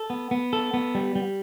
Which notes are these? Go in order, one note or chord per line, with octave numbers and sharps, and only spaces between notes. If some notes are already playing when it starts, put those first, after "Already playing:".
Already playing: A4
B3
B3
A4
B3
G3
G3